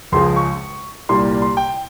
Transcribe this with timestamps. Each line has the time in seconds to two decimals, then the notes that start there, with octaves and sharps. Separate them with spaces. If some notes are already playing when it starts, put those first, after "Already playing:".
0.12 C#2 C#3 F3 G#3 C6
0.36 C#6
1.09 C2 A#2 G3 C6
1.42 C6
1.57 G5